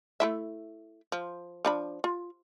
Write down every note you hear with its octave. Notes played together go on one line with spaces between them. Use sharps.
A3 E4 E5
F3
F3 D4 B5
F4